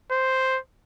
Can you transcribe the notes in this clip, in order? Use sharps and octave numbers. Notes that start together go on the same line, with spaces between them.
C5